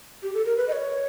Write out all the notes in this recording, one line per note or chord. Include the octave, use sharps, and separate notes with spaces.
G4
A4
A#4
B4
D#5
C#5